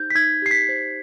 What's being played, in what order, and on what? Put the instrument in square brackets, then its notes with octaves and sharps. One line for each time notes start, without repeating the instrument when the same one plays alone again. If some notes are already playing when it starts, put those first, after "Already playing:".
Already playing: [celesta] D#4 G4 C5 G6
B6
D#4 G#6
G4 C7
B6
C5